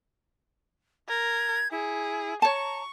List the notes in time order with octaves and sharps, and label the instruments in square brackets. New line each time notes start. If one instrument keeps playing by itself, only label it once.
[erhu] A#4 [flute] G#6
[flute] E4 [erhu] G#4
[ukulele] C#5 A5 [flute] A#5 [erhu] C#6